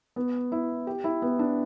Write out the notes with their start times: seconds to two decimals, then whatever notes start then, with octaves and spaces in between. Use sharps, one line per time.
0.16 B3
0.52 E4
0.87 G4
1.04 E4
1.22 B3
1.39 D4